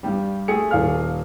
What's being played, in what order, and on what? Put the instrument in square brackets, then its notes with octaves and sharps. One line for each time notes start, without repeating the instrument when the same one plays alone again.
[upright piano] G2 G4 [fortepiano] G3
[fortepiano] A3 G#4 [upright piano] C#7
[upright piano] D#1 F5 F6